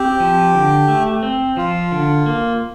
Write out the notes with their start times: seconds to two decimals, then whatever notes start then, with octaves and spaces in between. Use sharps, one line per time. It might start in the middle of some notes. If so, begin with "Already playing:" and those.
Already playing: C4 G4
0.20 F3
0.55 D3
0.88 A3
1.23 C4
1.57 F3 F4
1.92 D3
2.26 A#3